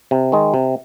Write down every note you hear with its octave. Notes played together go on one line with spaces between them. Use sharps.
C3
D#3 G#3
C3